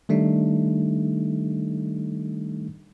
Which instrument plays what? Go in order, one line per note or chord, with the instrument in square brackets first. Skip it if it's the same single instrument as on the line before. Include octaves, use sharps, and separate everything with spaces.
[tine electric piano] D#3 G3 A3 D4 D#4